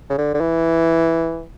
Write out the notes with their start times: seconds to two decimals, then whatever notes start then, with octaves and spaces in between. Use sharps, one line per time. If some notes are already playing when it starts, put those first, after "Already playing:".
0.10 C#3
0.18 D3
0.34 D3
0.40 E3